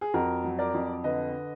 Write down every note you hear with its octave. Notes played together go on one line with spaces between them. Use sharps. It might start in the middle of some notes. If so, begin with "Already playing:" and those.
G#4
F2 F#4 A#4
F#3
A#4 D5
F2
D3 B4 D#5